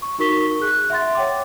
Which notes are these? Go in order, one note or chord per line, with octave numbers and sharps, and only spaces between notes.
C#6
D#4 F#4 A#4 C#6 B6 G7
G#4 F#6
E5 F#5 C6 A6
C#5 G5 D6